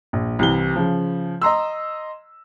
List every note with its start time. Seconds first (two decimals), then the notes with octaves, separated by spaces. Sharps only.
0.13 A#1
0.39 C2 C3 E3 G7
0.76 C#3 F3
1.42 D#5 A#5 C6 E6